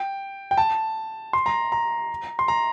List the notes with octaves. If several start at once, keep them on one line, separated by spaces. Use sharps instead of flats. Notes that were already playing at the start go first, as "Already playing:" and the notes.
Already playing: G5
G5
A5
C6
A#5
A#5
C6
A#5